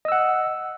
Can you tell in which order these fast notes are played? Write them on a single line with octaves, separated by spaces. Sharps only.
D#5 E6 F#5